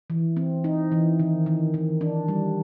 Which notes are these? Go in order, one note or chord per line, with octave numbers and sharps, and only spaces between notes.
E3
C4
D#4
E3
D#3
D#3
D#3
D4
G3